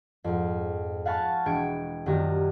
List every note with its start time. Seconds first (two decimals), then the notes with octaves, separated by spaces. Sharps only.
0.24 F2 G#2
1.06 F5 F#5 G#5 A5 B5 C#6
1.46 E1 G5 G#6 C#7 D7
2.06 D#1 F#2 D#3 F#4 G4 A#6